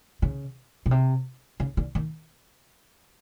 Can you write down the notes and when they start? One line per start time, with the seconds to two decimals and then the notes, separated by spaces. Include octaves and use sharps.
0.22 C#3
0.86 B2
0.91 C3
1.60 C#3
1.77 D3
1.95 D#3